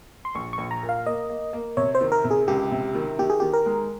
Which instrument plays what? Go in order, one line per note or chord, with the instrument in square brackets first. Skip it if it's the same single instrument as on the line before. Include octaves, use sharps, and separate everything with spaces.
[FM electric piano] C6
[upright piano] A#1 [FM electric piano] C#6
[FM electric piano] C#6
[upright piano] A#1
[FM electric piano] A#5
[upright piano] A#2
[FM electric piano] F5
[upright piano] A#3 [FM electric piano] D#5
[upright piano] A#3
A#3
[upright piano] C3 [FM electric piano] C#5
[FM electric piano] C5
[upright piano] D#3
[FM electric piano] A#4
[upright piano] C3
[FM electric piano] G#4
[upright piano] C#2 [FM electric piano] G4
[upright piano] C3
D#3
[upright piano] D#3 [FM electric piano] G4
[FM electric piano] G#4
[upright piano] D#3 [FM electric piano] G4
[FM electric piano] A#4
[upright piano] G#3